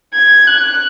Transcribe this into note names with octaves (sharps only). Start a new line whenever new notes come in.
G#6
F#6